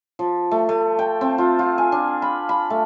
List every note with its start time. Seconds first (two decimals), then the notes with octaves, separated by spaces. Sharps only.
0.19 F3
0.51 A3
0.69 A3
0.99 G5
1.21 C4
1.38 F4
1.59 F4
1.78 G#5
1.92 D4
2.22 B5
2.49 B5
2.70 A3